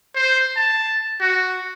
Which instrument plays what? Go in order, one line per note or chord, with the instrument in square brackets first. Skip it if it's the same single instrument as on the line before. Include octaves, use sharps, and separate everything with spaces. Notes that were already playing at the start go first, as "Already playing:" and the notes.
[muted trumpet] C5
A5
F#4